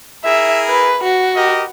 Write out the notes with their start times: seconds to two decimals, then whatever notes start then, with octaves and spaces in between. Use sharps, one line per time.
0.24 E4 G#4 A#4 E5
0.68 B4
1.03 F#4
1.35 G4 A#4 D#5